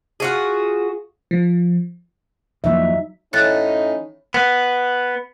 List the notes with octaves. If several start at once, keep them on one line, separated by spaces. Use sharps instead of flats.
F4 F#4 G#4
F3
F2 F3 F#3 A#3 D#4 E5
A2 C#4 D#4 C#5 F#6 A6
B3